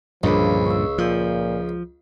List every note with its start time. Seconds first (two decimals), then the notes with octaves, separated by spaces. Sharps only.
0.23 C#2 G2 A#2 D3 F3 D4 A#4 B5
0.66 C#6 E6
0.98 A#2 F3 F4